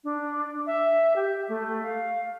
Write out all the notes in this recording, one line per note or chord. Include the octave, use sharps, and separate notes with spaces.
D4
E5
G4
A3
F5